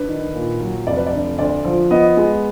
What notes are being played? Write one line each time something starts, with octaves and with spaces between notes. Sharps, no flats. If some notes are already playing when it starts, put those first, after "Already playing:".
Already playing: D4 B4
D#3
A#2
F#3
F1 D5
B4
D5
D3
D2 D5
F3
B3 D#5
G#3